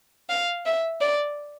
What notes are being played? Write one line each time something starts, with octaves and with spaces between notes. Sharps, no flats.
F5
E5
D5